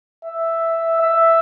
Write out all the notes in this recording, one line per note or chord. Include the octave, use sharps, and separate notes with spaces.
E5
E5